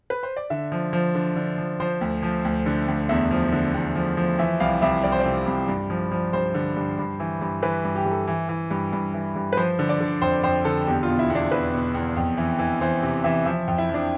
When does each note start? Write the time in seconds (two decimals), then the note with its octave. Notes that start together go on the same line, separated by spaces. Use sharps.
0.10 B4
0.23 C5
0.37 D5
0.50 D3 E5
0.72 F3
0.93 F3
1.15 D3
1.36 D3
1.58 F3
1.80 F3 C5
2.01 D2
2.23 F3
2.45 D2
2.66 D3
2.88 D2
3.09 E2 E5
3.31 F3
3.52 D3
3.74 E2
3.95 F3
4.17 F3
4.39 E3 E5
4.60 C2 F5
4.82 C2 E5
5.04 C2 D5
5.12 C5
5.20 D5
5.25 C3
5.47 C2
5.68 G2
5.90 F3
6.12 F3
6.33 G2 C5
6.54 D3
6.76 G2
6.98 G2
7.20 E3
7.41 G2
7.62 E3 B4
7.84 G2
7.95 G4
8.05 G2
8.11 A4
8.27 E3
8.49 E3
8.70 G2
8.92 G2
9.14 E3
9.36 G2
9.53 B4
9.57 F3 C5
9.79 D3
9.89 D5
10.00 D3
10.21 F2 C5
10.43 F2 C5
10.65 D3 A4
10.87 E2 G4
11.03 F4
11.09 B2
11.19 E4
11.30 E2
11.35 D4
11.51 E2 B4
11.73 B2
11.94 E2
12.17 F2
12.37 E3
12.59 E3
12.81 E3 C5
13.03 C3
13.24 E3 E5
13.46 F3 E5
13.68 F2
13.78 E4
13.89 F3
13.94 D4